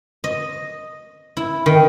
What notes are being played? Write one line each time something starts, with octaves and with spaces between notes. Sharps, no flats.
D#5
E4
D#3